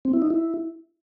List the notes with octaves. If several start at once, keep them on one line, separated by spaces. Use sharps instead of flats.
C4
E4
D#4
E4